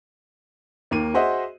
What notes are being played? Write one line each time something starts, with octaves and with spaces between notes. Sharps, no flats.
D#2 A#3 D#7
F#4 G#4 C5 D#5 E5 F#5